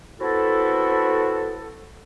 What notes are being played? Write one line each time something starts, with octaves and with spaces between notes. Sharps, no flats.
B3 C4 E4 F#4 A4